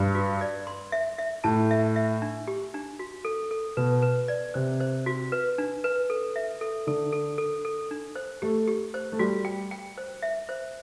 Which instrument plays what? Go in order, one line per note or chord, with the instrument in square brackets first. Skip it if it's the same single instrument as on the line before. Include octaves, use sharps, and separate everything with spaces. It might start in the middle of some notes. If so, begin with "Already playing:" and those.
Already playing: [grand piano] G2 [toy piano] B4
[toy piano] F#4
D5
C6
E5
E5
[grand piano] A2 [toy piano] A5
[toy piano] E5
E5
D4
G4
D4
F#4
A4
A4
[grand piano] B2 [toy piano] B4
[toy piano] B4
D5
[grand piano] C3 [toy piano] C5
[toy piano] C5
F#4
B4
D4
B4
A4
E5
A4
[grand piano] D3 [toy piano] A4
[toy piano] A4
A4
A4
D4
C5
[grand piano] A3 [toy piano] G4
[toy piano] G4
C5
[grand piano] A3
[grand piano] G3 [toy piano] F#4
[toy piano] G5
G5
C5
E5
C5